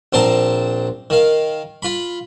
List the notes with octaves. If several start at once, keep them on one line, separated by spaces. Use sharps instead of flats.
A#1 C4 C5 A5 A#5
D#3 F5
F4 B5